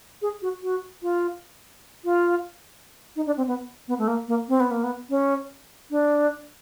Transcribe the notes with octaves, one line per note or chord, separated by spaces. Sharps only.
G#4
F#4
F#4
F4
F4
D#4
D4
C4
B3
B3
A3
A#3
A#3
C4
B3
A#3
B3
C#4
D4